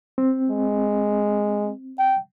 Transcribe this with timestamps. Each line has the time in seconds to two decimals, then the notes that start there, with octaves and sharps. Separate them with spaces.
0.18 C4
0.50 G#3
1.99 G5